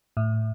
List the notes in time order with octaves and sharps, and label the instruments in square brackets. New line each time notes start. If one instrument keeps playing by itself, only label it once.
[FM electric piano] A2